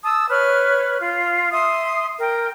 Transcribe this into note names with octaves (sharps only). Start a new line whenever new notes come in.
A5 D#6 E6
B4 C#5 F6
F4
E5 C6 D#6
A#4 G5